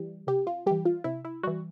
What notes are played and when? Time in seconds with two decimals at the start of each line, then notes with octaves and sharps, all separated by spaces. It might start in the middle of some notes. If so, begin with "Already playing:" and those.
Already playing: E3 G3
0.27 C3 G4
0.47 F4
0.66 E3 G3 G4
0.85 F4
1.04 C3 E4
1.25 E4
1.43 E3 G3 F#4